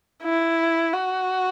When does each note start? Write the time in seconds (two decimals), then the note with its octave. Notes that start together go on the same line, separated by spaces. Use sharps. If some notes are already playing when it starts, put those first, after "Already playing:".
0.23 E4
0.93 F#4